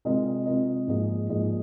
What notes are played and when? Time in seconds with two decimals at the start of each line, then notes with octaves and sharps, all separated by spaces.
0.05 C3 G#3 F4 A#4 D#5
0.46 C3 G#3 F4 A#4 D#5
0.88 G#2 F3 A#3 G#4 D#5
1.29 G#2 F3 A#3 G#4 D#5